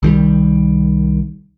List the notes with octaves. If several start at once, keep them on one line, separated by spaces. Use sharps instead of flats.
C2 D#3 F3 G3